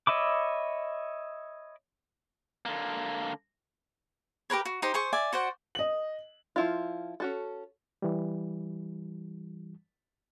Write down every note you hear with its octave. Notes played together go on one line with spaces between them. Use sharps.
C#5 D#5 E5 B5 D6
D3 A#3
G4 A#4 B4 C#5
F#4
D#4 G4 C5
G#4 C5 C#6
D5 E5 G#5
F#4 C5 D5 F#5
D#5 F#7
F3 E4 F4
C#4 F#4 A4
E3 G3